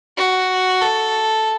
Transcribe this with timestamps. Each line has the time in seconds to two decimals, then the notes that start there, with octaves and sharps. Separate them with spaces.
0.17 F#4
0.81 A4